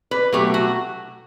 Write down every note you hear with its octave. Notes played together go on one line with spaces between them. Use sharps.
B4
B2 F#3 A3 G4
F#4